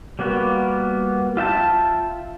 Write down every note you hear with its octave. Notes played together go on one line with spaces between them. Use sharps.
G3 A#3 B3 F#4
F4 E5 G5 A5